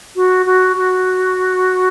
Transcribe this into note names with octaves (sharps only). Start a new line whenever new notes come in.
F#4
F#4
F#4